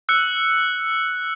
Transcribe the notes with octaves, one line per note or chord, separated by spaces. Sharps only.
E6 F#6 C#7